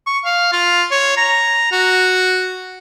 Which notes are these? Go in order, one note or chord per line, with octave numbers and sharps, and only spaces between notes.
C#6
F5
F4
C#5
A#5
F#4